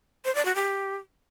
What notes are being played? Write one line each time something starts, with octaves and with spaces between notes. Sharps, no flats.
C5
D5
F#4
G4